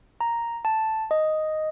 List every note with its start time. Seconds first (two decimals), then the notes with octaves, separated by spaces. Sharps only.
0.21 A#5
0.65 A5
1.11 D#5